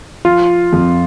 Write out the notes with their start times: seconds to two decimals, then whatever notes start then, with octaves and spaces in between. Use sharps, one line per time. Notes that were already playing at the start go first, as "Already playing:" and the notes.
0.25 F3 F4
0.73 F2